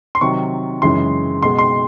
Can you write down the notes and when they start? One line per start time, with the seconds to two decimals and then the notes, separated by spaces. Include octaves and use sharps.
0.15 C6
0.21 C3 D#3 F#3 C#6
0.82 F#2 C#3 E3 G#3 C6
1.42 B2 G#3 C6
1.58 C6